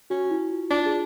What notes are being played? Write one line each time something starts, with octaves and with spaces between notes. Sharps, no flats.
C#4 F#4
E4
F4
D4 F4
G#4